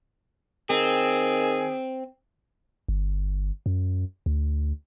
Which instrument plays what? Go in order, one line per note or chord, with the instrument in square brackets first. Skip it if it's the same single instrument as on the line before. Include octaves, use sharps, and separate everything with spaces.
[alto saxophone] D#3 [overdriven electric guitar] C4 [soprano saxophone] G#4
[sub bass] G1
F#2
D2